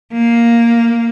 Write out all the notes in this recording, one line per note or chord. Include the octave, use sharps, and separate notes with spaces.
A#3